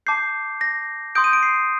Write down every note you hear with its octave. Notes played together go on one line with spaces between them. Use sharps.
A5 D6 G6 C7
A#6
C6 D#6 G6 D7
D#7
D7
C7